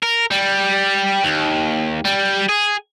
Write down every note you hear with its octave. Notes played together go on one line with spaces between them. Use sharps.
A#4
G3
D#2
G3
G#4